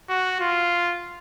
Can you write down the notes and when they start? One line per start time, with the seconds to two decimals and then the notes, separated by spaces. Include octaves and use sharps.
0.09 F#4
0.40 F4